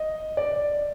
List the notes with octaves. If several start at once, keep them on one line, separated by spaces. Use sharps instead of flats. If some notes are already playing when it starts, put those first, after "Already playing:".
Already playing: D#5
D5